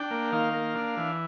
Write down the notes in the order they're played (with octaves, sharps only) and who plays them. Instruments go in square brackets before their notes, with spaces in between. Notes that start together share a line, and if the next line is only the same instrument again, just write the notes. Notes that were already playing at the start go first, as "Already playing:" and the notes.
Already playing: [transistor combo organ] D4 G5
A#3
D#3 F5
A#3
D4
E3